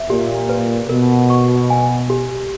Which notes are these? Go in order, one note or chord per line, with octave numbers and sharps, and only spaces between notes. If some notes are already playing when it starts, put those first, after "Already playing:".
Already playing: E5
A#2 G4
B4
B2 A#4
C#6
G#5
G4